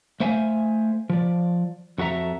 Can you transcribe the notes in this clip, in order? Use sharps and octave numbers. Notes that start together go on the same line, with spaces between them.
A3 C5 E5 F5 G#5
F3 D5
F2 F#4 A4 E5 A#5